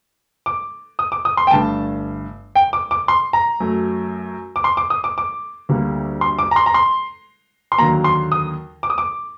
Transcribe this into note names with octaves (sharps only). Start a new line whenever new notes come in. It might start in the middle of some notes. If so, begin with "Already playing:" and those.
D6
D#6
D6
D#6
C6
G5
G1 G2 D3 A3 A5
G5
D6
D6
C6
A#5
F#2 F#3 A3
D6
C6
D6
D#6
D6
D6
D2 D3 G3 A#3
C6
D6
A#5
C6
A#5
C6
C6
D#2 D3 F#3 A#3 A#5
C6
D#6
D6
D#6
D6